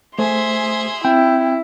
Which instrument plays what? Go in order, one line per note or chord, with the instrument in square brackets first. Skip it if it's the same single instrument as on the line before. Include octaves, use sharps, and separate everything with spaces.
[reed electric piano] A3 C5 [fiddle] G#4 E5 [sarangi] C6
[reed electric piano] C4 [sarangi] E4 [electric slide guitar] G5